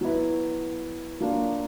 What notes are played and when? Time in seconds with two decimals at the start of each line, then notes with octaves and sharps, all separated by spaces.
0.01 F#3 B3 E4
1.20 F#3 A#3 D4 F4